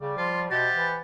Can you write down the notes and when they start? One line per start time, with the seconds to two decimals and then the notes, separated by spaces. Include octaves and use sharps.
0.01 C#3 G3 D5
0.17 F3 F4
0.51 B2 G4 C5 E5 F#5 A6
0.75 E3